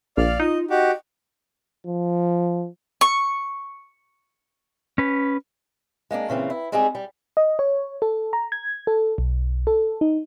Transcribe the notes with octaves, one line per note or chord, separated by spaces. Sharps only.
A#1 D5 F5 F6
D#4 F4 D#5
F#4 G4 D#5
F3
C#6
C#4 B4
G#3 A#3 C#4 D4
A#2 C#3 E3 C4
E4
G3 G#3 C4 D#4 G4 G#4
G3
D#5
C#5
A4
A#5
G#6
A4
B1
A4
D#4